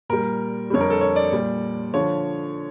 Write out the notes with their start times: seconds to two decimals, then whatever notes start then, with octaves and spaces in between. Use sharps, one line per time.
0.09 A#2 G3 A#4
0.70 F2 D3 G3 C#5
0.81 A#4
0.90 A4
1.01 C#5
1.16 D5
1.32 A#2 G3
1.94 D3 F3 C#5